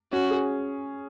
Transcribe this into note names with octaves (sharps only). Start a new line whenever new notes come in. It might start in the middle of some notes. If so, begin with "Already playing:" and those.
C#4 F#4
G#4